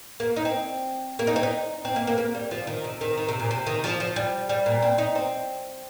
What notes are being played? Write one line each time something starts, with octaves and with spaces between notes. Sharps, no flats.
A#3
D#4
C4
A#3
D#4
C4
D#4
C4
A#3
A#3
A#3
G3
F3
D#3
C3
D#3
D#3
C3
A#2
C3
D#3
F3
F3
G3
G3
A#2
C4
D#4
C4